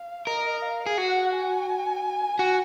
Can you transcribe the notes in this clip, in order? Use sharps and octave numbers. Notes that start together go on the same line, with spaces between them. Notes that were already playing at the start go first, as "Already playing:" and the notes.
Already playing: F5
A#4 D#5
F5
G#4
F#4 F#5
G#5
F#4